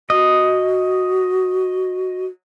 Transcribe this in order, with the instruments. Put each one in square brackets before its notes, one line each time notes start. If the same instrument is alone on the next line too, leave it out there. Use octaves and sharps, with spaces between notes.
[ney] F#4 [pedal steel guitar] D#5